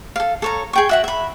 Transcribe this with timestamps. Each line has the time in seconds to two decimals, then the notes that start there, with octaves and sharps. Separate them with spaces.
0.16 A4 F5
0.42 A4 C#5 A#5
0.73 G#4 G5 C#6
0.89 F#4 E5 F#5
1.04 E5 B5